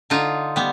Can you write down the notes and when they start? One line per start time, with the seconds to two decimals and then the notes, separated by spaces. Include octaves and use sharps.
0.10 D3 D#4 F4
0.56 G3 B3